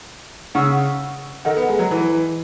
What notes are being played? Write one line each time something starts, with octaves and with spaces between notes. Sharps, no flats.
C#3 F#5 C#6 E6
D#3 A4 D#5 F#5
B3
G#3
F#3
E3